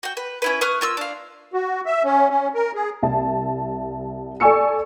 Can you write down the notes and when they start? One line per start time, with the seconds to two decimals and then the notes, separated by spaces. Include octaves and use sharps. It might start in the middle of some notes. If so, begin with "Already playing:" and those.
0.03 F#4 G5
0.17 B4
0.42 C#4 E4 B4
0.61 B4 C#6 D#6 F6
0.81 A#3 F4 E6
0.97 D4 F5
1.53 F#4
1.86 E5
2.05 C#4
2.30 C#4
2.54 A#4
2.75 G#4
3.03 C2 E5 A5
4.40 A4 D5 G#5 C#6 E6 C#7